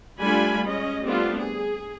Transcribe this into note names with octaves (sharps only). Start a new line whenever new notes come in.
G3 A3 D4 F4 G#5 B5
G#3 C#4 D#5
G3 A3 B3 C4 D4 F4
G#4